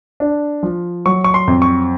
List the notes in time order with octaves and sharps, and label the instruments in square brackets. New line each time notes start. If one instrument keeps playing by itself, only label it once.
[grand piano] D4
F3
F#3 C#6
C#6
C6
F2
C#6